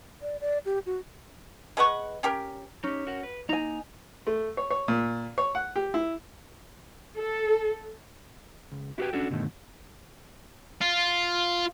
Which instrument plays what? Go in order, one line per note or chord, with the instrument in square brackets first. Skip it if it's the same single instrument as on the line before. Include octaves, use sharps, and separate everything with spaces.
[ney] D5
D5
G4
F#4
[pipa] G#3 B4 F#5 C#6
C#4 G4 A#4
[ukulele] C#4 [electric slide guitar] D#4 G4
[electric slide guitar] F#4 A#4 F#5
B4
[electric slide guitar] A#3 A#5 [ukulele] D#4 G#5
[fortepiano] A3
C#5
C#5
A#2
C#5
F#5
G4
E4
[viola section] A4
[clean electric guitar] C#2
E4 F#4 G4 A#4 B4 G5
C#4 D4 F#4 A4
G2 B2 D3 D#3 A3
[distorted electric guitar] F4